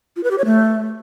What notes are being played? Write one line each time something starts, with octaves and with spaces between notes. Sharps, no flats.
F4
B4
G4
C#5
A3